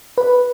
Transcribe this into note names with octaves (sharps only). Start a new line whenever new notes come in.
B4